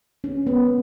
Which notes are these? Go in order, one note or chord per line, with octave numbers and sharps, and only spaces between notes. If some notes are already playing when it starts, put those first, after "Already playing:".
C#4
B3